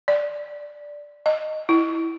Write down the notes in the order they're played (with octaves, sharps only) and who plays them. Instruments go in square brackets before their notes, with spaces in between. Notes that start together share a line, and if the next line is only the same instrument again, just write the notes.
[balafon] D5
D#5
E4